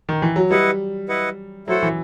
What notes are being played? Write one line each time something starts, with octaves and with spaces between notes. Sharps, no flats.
D#3
E3
F#3
G3 E4 B4 D#5 F#5
E4 B4 D#5 F#5
F#3 A3 E4 A4 C5 F#5
E3